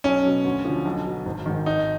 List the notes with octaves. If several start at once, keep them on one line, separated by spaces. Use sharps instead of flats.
B1 C#4
B2 F#3
D2
D3 F3
B1
B2 F#3
G#1
G#2 D#3
G#1 D#4